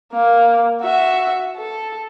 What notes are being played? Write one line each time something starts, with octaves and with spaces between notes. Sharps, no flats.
A#3
F#4 E5
A4